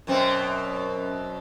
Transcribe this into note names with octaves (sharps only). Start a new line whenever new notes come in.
F#2 B2 C4